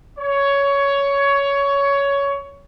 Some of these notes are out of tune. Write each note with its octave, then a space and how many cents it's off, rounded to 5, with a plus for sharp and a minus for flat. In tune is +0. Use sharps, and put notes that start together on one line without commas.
C#5 +15